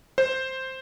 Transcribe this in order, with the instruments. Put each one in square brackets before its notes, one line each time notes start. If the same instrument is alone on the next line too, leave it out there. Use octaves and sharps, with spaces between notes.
[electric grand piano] C5